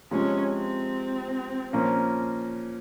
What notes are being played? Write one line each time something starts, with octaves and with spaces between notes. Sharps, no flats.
C3 F3 G#3 C#4
C4
A#2 F3 A#3 C#4